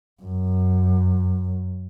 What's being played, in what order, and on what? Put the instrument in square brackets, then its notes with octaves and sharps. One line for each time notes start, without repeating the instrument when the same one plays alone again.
[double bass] F#2